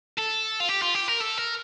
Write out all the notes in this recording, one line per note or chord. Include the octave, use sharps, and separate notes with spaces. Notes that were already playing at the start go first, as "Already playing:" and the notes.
A4
F4
G4
F4
G4
A#4
A4
A#4